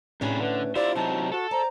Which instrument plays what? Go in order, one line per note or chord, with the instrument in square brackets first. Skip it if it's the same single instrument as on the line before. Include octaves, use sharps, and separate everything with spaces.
[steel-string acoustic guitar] A2 C#4 D4 [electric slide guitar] C3 G#4 B4
[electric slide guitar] D3 [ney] B4
[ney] E4 [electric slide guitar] F4 E5 [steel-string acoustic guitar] G4 C5 [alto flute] D5
[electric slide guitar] C3 F#3 D#4 [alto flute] A5
[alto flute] F#4 [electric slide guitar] A4
[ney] C5 [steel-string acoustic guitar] D5 [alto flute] A#5